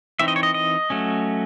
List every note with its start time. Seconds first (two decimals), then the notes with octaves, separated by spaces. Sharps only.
0.19 E3 C4 D#4 E5
0.28 D#5
0.36 C#5
0.43 D#5
0.54 D#5
0.90 F#3 A3 C#4